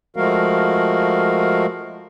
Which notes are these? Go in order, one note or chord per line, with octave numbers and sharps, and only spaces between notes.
F3 G#3 A3 F#4 A#4 F5